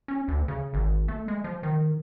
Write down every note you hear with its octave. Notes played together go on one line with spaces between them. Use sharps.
C#4
D2
C#3
G#1
A3
G#3
F3
D#3